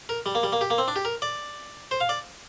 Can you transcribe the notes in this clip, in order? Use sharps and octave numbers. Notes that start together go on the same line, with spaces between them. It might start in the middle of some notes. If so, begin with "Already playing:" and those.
A#4
G3
A#3
G3
A#3
G4
A#3
C4
D4
G4
A#4
D5
C5
F5
D5